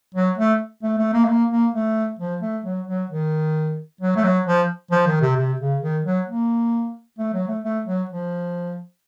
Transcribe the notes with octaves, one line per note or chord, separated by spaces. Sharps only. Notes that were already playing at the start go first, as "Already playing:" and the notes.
F#3
A3
A3
A3
A#3
A3
A#3
A#3
A3
F3
A3
F#3
F#3
D#3
F#3
A3
F#3
F3
F3
D#3
C3
C3
C#3
D#3
F#3
A#3
A3
F#3
A3
A3
F#3
F3